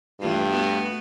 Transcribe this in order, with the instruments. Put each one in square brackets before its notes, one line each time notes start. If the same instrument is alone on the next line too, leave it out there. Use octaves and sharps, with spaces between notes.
[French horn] G2 [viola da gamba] E3 A3 F4
[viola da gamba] A3 B3 F#4